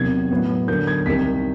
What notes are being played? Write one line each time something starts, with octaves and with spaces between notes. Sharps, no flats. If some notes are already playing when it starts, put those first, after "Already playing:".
Already playing: E2 C3 D#3 F#3 G#6
A2 F#3 B3
D3 F#3 A#3 G6
G#6
C2 C3 D#3 B6